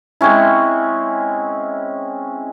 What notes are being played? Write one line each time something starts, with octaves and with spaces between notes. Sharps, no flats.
G#3 C4 C#4 E4